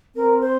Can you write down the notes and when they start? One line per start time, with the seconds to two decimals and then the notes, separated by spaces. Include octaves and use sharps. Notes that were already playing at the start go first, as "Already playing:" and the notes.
0.15 C4 A#4
0.41 C5